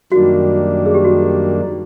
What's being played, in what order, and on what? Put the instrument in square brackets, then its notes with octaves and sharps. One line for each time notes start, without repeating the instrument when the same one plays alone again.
[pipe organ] F#2 D#3 G3 A#3 D4 [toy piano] F#4
[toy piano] G#4
G4
F#4